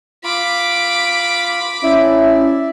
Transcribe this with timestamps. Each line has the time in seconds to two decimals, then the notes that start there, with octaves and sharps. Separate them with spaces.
0.24 F4 B5 D6
1.84 C#4 E4 D5 E5